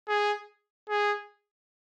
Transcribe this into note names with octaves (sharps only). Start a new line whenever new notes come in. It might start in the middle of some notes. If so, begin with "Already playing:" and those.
G#4
G#4